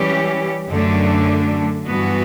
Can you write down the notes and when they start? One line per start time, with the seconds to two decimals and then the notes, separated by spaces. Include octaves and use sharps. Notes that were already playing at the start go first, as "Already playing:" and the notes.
Already playing: E3 G3 C#4 G4
0.70 F#2 D3 A3 D4
1.86 G2 E3 B3 F#4